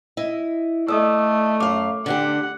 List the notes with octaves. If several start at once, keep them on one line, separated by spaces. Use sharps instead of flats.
E4 D#5
A3 D5 D#5 D#6 E6
F#2 F5 D6
D3 D4 G4 F#5